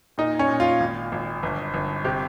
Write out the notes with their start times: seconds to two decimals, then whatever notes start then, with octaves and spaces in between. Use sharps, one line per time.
0.18 A#2 D#4
0.39 C#4
0.49 A#2
0.60 F4
0.80 G#1
1.12 G#1
1.43 G1
1.74 G1
2.04 C3 G4